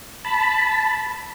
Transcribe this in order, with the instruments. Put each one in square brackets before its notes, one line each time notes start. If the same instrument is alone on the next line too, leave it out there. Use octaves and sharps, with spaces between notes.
[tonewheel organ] A5 B5